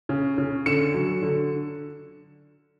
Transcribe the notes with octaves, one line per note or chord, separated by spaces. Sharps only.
C#3
C#3
D3 C#7 E7
F#3
D3